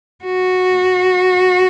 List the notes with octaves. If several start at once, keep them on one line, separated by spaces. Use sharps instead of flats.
F#4